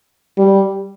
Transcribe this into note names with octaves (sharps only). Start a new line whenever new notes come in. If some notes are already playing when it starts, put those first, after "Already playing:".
G3